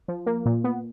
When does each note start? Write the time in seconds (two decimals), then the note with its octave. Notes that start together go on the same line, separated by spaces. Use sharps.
0.08 F3
0.26 A#3
0.46 A#2
0.64 B3